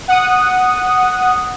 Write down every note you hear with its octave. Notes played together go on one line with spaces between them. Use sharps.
F#5 D#6